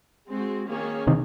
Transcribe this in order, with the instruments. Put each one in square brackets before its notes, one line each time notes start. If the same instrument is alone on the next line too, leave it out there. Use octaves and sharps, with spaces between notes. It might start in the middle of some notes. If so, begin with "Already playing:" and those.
[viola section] G#3 C4 F#4
D#3 A#3 C#4 G#4 C#5
[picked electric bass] C3 D#3